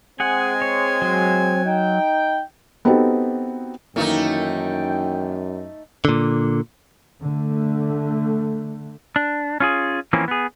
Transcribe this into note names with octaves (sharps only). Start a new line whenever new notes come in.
G#3 C4 G#4 F#5 G#5
C#5
F#3
D#4 G5
B3 C4 D#4 F#4 G4 A4
F#2 D#3 E3 A3 A#3 D#4 G5
A#2 D3
D3 A3
D4
C#4 F4 G#4
E3 F3 A#3 C4 C#4
B3 G#4